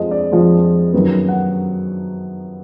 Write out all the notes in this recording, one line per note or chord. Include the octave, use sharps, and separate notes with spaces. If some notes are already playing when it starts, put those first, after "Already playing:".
Already playing: F2 F3 G#3 D#5
D5
F2 F3 G#3
F#2 D#3 F#3 B3
F#5